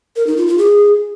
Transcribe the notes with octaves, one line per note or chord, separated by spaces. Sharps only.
A#4
D#4
F4
F4
G#4